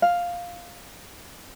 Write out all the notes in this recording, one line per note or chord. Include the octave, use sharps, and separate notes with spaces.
F5